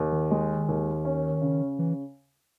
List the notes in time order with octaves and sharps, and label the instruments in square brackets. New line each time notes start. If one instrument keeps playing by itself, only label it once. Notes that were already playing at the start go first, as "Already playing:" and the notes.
Already playing: [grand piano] D#2
[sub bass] D#3
[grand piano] G#3
D#2
C#4
C#3
[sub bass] E3